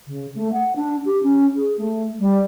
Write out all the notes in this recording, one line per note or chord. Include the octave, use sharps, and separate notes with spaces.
C#3
A3
F#5
D4
G4
C#4
G#4
A3
G3